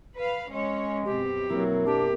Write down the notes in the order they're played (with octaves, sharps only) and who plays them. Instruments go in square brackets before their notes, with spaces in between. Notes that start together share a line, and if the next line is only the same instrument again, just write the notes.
[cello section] B4 F5
[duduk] G#3 [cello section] C#4 C#5
[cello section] F#2 B2 C4 [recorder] G4
[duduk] F#3 [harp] A#3 E4
[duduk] D4 [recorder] G4